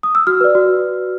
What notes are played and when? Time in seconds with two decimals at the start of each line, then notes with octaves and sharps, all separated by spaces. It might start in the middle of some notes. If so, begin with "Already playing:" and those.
0.03 D#6
0.15 E6
0.27 F#4 F6
0.41 B4 D5
0.55 F#4